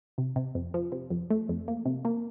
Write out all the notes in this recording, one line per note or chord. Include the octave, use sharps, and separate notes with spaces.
C3
C3
F2
F3
C3
F2
A3
F2
A#3
C3
A#3